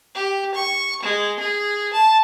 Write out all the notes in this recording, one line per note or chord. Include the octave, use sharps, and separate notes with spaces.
G4
C#6
G#3
G#4
A5